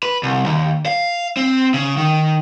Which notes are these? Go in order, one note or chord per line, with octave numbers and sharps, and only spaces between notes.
B4
C2
D#2
F5
C4
C#3
D#3